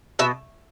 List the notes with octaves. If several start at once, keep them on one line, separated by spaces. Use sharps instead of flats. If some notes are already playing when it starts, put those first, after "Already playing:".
B2 E5